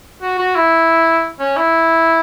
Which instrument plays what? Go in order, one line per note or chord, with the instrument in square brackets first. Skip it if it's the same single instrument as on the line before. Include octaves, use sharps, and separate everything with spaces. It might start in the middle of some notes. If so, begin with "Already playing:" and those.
[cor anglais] F#4
F#4
E4
C#4
E4